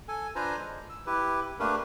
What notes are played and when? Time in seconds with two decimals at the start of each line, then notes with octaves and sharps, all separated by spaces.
0.08 A4 G#5
0.36 D4 F4 B4 C5 G#5 A#5
0.58 G#3
0.90 E6
1.06 E4 G4 B4
1.60 A3 A#3 D4 G4 A#4 B4